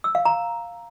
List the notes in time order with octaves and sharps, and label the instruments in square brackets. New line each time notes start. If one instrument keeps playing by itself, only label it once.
[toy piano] E6
F5
A#5